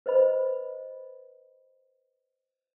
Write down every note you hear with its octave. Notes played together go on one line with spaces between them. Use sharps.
B4 C5 D#5 B5